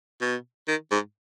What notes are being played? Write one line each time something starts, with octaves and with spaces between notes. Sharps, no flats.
B2
D#3
G#2